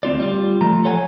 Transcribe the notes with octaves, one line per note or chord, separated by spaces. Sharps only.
D2 C4 F4 D5
G3 F4
F3 A3 A#5
A4 C#5 F#5 G#5